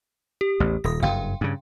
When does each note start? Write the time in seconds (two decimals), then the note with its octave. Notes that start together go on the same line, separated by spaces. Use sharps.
0.41 G4
0.60 A1 E2
0.84 D#1 D#6 A#6
1.03 F#1 G2 F5 G5 C6
1.41 G2 C#3